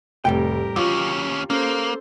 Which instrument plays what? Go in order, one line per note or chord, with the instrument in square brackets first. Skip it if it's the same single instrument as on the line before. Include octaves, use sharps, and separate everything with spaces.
[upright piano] F1 [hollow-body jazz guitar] A2 G3 G5 [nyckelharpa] G4 A#4
[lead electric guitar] D#2 C#4 [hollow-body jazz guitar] F#3 [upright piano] F4
[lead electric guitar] A#3 [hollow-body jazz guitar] C#4 [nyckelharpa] A4 C5